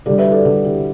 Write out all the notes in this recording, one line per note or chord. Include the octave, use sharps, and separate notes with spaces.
D3 G3 A4 D5
B4 E5
A4 D5
D3 G3 A4
G4